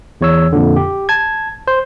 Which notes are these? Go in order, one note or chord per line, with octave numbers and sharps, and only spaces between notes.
E2 C#5 E6
F2 A#2 D3
G4
A5 G#6
C5